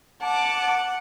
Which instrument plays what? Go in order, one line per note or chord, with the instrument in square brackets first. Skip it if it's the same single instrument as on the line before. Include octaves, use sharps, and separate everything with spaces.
[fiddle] F#5 [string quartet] A5 D6